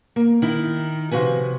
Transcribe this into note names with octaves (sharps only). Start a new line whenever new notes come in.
A#3
D#3 E4
C3 F3 F#4 B4 G#5